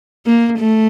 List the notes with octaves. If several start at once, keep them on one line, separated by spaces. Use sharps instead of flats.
A#3
A3